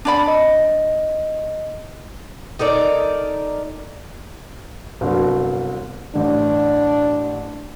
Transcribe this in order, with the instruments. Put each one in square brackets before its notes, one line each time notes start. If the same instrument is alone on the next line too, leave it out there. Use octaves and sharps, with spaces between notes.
[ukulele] D4 D5 B5
[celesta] D#5
[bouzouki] D#4 A4 A#4 D5
[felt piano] G1 C2 F#3
[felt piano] A1 [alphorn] D4